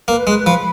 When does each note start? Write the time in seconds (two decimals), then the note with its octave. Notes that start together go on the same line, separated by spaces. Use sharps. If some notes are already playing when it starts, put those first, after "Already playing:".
0.08 A#3 B4
0.27 G#3 B4
0.46 F3 B5